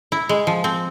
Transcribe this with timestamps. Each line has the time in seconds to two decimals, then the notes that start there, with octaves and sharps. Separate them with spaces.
0.12 E4
0.29 G#3
0.47 F3
0.64 C4